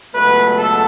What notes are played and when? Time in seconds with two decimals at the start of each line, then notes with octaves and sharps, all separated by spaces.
0.13 C#2 B2 F#3 A3 B4
0.55 A4